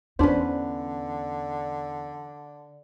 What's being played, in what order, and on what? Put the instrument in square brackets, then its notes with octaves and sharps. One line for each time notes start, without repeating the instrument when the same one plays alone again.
[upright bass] E2 [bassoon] D3 [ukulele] C#4 B4 [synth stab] D4 C5